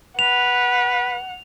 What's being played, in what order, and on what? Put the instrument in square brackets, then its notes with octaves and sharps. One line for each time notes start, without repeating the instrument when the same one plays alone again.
[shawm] B4 [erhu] F#5 [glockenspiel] F7